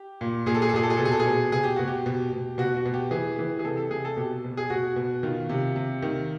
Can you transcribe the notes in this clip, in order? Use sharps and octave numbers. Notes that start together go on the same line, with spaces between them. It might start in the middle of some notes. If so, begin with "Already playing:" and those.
Already playing: G4
A#2
A#2 G#4
A4
G#4
A4
A#2 G#4
A4
G#4
B2 A4
G#4
A4
G#4
B2
B2 G#4
G4
B2 F#4
G4
B2
B2
B2 F#4
F#4
B2
G4
E3 G#4
E3
G#4
C3 A4
A4
C3 G#4
A4
B2 G4
B2
G#4
B2 F#4
B2
D#3 F4
C3
C3
D#3